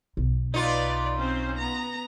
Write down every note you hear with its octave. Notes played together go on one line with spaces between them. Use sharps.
B1
D#4 F4 B4 D5
C4 C#4 C5
B3 A#5